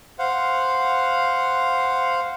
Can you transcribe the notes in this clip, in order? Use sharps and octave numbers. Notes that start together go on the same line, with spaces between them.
C5 F5 F#5